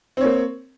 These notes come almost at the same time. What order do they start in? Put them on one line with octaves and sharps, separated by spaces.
C4 C#5 A#3